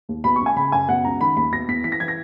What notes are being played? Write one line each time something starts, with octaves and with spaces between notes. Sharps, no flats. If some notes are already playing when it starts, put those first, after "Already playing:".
D#2
B2 B5
C#6
C#2
G#5
C#3 B5
F#2 G#5
B2 F#5
C#2 A#5
D#3 B5
D#2 B5
B2 A#6
E2 B6
E3 B6
A#6
E3 G#6
A#6